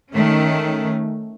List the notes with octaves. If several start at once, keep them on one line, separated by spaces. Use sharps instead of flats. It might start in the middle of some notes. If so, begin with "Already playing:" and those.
D#3 A3 C#4